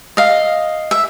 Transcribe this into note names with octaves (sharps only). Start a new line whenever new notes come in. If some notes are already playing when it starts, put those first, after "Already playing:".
D#5 F5
E5